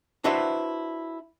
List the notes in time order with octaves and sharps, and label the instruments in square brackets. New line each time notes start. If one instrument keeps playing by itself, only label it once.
[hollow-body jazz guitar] D4 E4 F#4 B4 C5 E5